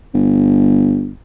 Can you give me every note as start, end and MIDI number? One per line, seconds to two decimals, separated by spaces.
0.14 1.11 31